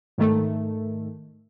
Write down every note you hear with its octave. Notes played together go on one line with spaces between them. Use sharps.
G#2 D#3 A3